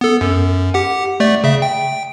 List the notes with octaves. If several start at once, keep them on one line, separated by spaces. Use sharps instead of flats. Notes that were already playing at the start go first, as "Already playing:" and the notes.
B3 A4
F#2
G4 F#5
A3 D5
C#3 E5
G5